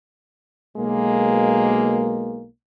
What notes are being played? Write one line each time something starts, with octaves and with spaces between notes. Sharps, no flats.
B1 B2 G#3 A#3